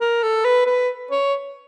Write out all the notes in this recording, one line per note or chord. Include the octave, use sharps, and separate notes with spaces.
A#4
A4
B4
B4
C#5